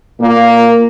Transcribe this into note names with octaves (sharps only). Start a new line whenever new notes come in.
A#2 A#3